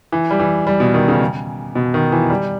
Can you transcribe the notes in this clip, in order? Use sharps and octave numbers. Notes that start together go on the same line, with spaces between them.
E3
G3
E3
G3
B2
D#3
C#3
B2
D#3
E3
G3